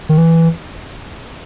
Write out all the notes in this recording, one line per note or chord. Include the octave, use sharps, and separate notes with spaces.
D#3
E3